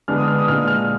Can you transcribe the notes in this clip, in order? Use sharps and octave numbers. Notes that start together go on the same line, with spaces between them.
D3 G#3 B3 D4 F6
D#6
F6
D#6
A#2 G#3 D4 F6
F6